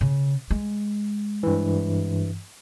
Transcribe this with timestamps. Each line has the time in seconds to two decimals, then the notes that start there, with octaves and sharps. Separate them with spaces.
0.01 C#3
0.50 G#3
1.43 G2 E3